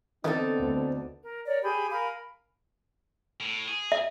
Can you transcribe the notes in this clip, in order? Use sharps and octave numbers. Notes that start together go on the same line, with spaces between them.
D3 D#3 B3 C4 D4 D#4 A4
D2
A#4
A#4 C#5 D5
G4 G#4 B5
A#4 F5 G#5 B5
A2
G#4
E5